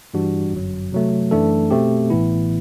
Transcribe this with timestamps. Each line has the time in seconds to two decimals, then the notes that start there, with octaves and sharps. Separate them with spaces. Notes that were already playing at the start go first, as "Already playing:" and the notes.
0.14 G2 E3 G3 D4 F#4
0.53 G1 F#2 F#3
0.92 C3 F#3 A3
1.31 F#2 E3 A3 D4 A4
1.71 B2 A3 C4 G4
2.10 A1 A2 E3 B3 E4